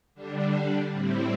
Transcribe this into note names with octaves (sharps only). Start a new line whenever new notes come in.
D3 G3 D4
A2 G3 C4 E4